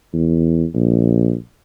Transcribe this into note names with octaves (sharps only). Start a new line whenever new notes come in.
E2
A#1